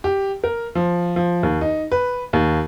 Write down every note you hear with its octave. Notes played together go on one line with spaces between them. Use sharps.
G4
A#4
F3
F3
D#2
D#4
B4
D#2